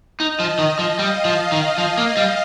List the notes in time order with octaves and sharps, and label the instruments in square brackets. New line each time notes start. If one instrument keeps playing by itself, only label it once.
[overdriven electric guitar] D#4 [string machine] D#5
[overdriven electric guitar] F3
D#3
F3
[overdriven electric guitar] G3 [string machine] F5
[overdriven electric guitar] F3
D#3
F3
A#3
G3